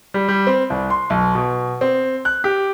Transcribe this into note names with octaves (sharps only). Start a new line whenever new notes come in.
G3
G3
C4
C2
C6
B1
B2
C4
F#6
G4